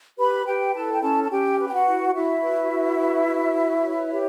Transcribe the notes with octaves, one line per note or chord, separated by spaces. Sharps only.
G4 B4 B5
G4 B4 G5
E4 A4 A5
G5
C#4 A4 A5
A5
C#4 G4 G5
B4
G5
F#4 F#5
E4
E4 F#4 E5
B4
F#4
B4
F#4
B4
C#5
G4